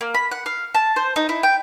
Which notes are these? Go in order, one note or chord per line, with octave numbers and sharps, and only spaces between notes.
A#3
B5
F#5
F5
A5
C5
D#4
E4
G5